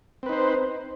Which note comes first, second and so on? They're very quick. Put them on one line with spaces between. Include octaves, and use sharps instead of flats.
C4 B4 D#4 C5